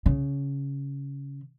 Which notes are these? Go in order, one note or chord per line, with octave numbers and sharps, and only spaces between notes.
C#3